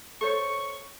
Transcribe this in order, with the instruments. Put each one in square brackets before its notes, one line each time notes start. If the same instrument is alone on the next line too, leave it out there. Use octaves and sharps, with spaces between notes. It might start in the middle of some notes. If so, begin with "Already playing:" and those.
[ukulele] A4 C5 C#5 [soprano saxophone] C#6